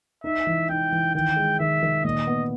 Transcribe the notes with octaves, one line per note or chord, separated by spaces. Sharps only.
D#4 E5
E3
D#4 G5
E3
D#3 G5
G#3
D#3 E5
D#3
A#2 D#5
B3